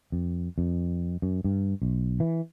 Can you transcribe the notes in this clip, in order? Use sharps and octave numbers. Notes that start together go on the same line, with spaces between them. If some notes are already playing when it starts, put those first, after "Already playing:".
F2
F2
F#2
G2
B1
E3